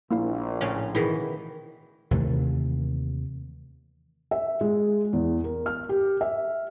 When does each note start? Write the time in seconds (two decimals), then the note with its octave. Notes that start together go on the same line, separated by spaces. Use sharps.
0.11 A#1 A#2 A#3 E4 F5
0.61 A2 C#3 C#4
0.95 B2 D#3 E3 E4 G#4
2.11 D#2 C3 E3 A3
4.31 E5
4.61 G#3
5.13 E2
5.44 A#4
5.66 F6
5.89 G4
6.21 E5